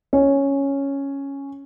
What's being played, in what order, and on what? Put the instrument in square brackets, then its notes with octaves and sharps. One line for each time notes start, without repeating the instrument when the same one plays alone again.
[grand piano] C#4